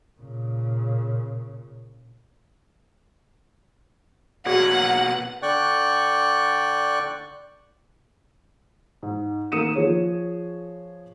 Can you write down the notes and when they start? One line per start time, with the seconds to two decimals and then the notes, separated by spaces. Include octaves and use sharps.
0.19 A#2 C#3
4.46 B2 A#3 F#4 G#4 C#5 D5 F#5
5.42 D3 D5 G5 C#6 F#6
9.03 G#2
9.52 D#3 A#3 D#6 C#7 D#7 E7
9.75 F3 G#4 C#5